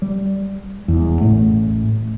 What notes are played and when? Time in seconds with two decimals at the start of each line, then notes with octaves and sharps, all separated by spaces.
0.02 G3
0.88 E1 E2
1.21 A1 A2 A3